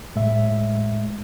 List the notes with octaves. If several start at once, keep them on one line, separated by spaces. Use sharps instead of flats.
A2 G#3 E5